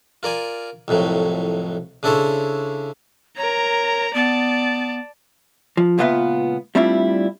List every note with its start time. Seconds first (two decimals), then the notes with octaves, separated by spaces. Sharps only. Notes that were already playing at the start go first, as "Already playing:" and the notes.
0.23 F4 A#4 D5 G#5
0.88 C2 F2 A2 F#3
2.03 C#3 D4 E4 A4 C5 C#5
3.37 A#4 C#5 A#5
4.14 B3 D5 A5
5.77 F3
5.98 C#2 A#2 B3 F4 B4 E5
6.75 G3 A3 C4 D4 E4 F4